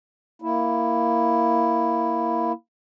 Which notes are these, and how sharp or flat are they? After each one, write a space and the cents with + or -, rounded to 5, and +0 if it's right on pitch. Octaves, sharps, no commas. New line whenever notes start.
A#3 +0 E4 +0